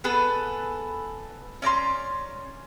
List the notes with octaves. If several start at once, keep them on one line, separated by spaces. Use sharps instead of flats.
B3 G#4 A4 B4
C#4 D5 A#5 C6